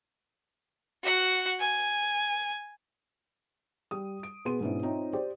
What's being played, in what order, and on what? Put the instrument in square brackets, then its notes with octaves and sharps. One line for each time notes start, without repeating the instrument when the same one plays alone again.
[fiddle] F#4 F#5
G#5
[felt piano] G3 D#6
D7
B2 B3 G#4 C6 D#7
G#2 B2 B3 C#4 D4 E4
C4 D#4 F4 C5 C#5 E5
G4 C5 D5 G5